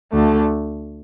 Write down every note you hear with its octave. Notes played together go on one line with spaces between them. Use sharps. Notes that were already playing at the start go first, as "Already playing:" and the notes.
D2 D3 A3